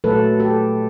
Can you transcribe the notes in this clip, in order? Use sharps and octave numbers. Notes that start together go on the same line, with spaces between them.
A#2 F#3 A3 A4 B4
G4 A4